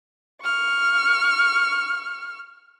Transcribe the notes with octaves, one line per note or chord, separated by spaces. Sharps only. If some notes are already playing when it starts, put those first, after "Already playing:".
C#6 F6